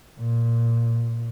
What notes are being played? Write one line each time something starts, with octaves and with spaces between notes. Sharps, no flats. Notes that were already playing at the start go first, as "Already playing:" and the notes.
A#2